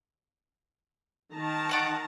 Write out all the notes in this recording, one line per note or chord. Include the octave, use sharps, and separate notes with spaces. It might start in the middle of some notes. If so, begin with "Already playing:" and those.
D#3 A5 A#5
D5 F#5 C#6